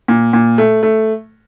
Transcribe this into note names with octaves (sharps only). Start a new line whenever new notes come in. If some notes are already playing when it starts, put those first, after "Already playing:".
A#2
A#2
A3
A3